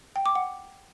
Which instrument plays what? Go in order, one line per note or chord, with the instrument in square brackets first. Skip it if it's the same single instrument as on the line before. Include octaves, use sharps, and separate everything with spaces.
[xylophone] G5
D6
F#5